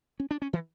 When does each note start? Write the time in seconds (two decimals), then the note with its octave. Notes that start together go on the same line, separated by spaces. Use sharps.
0.20 C#4
0.31 D4
0.42 C#4
0.53 E3